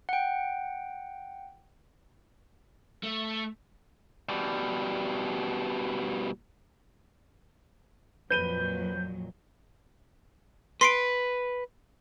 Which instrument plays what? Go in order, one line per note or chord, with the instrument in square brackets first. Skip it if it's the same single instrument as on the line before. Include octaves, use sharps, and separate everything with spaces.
[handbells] F#5 G5
[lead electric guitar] A3
B2 G3
[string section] F2 A#2 F#3 [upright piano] B4 D#7 G7 [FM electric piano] G6
[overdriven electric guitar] B4 [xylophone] C6 C7 D7